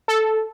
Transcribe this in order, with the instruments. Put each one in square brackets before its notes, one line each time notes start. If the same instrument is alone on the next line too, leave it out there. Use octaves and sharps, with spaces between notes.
[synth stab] A4